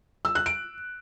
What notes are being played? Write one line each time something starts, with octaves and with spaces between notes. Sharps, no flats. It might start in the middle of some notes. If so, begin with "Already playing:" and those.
E6
F#6
D7